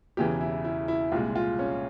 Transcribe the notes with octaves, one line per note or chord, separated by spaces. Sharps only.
E1 E2 C#3 E3 G4
E4
E4
E4
C2 A#2 G#3 F4
F4
C#4